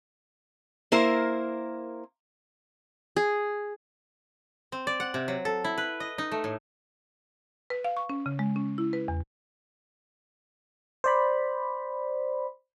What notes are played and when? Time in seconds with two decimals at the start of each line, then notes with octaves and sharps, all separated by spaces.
0.92 A#3 E4 A#4 C5
3.16 G#4
4.72 C4
4.87 D5
5.00 F#5
5.14 C3
5.28 F#3
5.45 A4
5.64 E4
5.78 B4
6.00 D#5
6.18 D#4
6.31 A3
6.44 A2
7.70 B4
7.85 F5
7.97 C#6
8.10 C#4
8.26 C#3
8.39 G#3
8.56 C#4
8.78 E4
8.93 B4
9.08 E2
11.04 C5 D5 B5